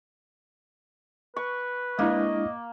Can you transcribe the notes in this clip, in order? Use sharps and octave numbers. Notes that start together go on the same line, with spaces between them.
B4 C#6
G#3 A#3 D4 E4 D#5